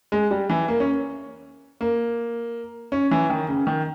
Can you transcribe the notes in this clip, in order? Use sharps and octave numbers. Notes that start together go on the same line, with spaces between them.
G#3
G3
E3
A#3
C#4
A#3
C#4
E3
D#3
C#3
D#3